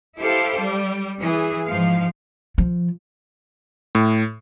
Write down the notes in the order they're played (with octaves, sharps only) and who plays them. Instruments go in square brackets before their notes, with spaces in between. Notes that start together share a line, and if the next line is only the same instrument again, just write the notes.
[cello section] E4 G4 A4 C5 F5
G3
E3 G#4
G#2 F3 F5
[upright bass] F3
[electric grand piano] A2